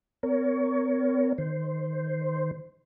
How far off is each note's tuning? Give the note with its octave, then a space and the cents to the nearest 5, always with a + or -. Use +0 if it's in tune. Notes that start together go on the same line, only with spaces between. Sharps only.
C4 -40 A#4 +0 C#5 +25
D#3 +0 C5 -5